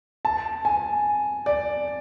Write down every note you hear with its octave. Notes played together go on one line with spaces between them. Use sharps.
A5
G#5
D5